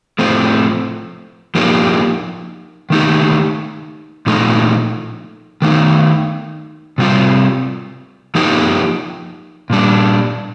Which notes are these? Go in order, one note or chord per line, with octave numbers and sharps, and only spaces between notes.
A2 F3 A3 C4
F3 A#3 D#4 G4
D#3 A3 D#4 G4
A#2 F3 A3 D#4
D#3 A3 D#4
C3 G3 C4 F4
F3 A#3 D#4 G4
A#2 G3 D4